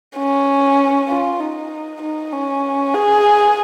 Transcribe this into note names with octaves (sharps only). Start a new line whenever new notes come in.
C#4
F4
D#4
D#4
C#4
G#4